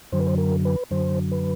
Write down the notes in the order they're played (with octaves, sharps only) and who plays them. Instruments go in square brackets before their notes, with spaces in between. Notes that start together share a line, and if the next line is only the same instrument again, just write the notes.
[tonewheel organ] F#2 D3 F#3 C5
B4
C5
A#4
B4
F#2 D3 F#3 C5
B4